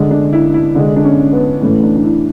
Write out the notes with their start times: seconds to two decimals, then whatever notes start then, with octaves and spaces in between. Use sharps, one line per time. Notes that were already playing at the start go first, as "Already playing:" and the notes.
Already playing: D3 G#3
0.11 D4
0.33 E4
0.54 E4
0.75 D3 G#3 D4
0.96 D4
1.04 C#4
1.33 B3
1.61 A2 E3 A3 C#4
1.83 D4
1.97 D4
2.05 E4